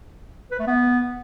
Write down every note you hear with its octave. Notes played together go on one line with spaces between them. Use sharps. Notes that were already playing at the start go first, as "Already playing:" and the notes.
B4
A3
B3